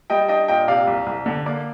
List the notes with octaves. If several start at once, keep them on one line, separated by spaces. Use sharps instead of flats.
G3 D#5 G5
D4 D#5 G5
A#2 D#5 G5
C3 D5 F5
C2
C2
D3
A#3 D5